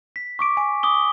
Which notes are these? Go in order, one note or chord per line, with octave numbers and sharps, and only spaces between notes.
B6
C#6 D6 D7
G#5 D7
D6 D#6 G7